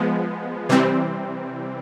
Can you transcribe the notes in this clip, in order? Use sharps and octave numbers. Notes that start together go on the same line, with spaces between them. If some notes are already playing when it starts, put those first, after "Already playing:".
Already playing: F3 G#3 B3
C3 E3 G3 C4